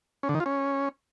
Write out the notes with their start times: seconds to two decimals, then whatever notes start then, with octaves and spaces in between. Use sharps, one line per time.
0.23 C#4
0.29 D3
0.35 D#3
0.40 F4
0.46 C#4